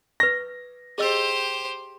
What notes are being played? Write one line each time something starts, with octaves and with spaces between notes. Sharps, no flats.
B4 C#6 A#6
G4 G#4 C5 D#5 E6